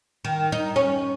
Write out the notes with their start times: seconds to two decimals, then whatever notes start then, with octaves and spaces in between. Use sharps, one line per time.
0.25 D#3
0.52 D#4
0.76 C#4